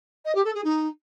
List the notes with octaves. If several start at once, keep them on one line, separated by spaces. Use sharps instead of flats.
D#5
G4
A4
G#4
D#4